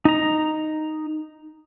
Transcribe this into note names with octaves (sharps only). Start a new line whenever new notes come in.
D#4 A#5